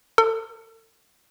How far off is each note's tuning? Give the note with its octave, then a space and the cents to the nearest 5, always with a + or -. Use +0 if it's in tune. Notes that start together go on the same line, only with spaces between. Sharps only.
A4 +40